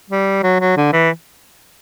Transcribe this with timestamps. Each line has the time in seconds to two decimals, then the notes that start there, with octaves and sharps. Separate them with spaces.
0.11 G3
0.43 F#3
0.60 F#3
0.77 D3
0.93 E3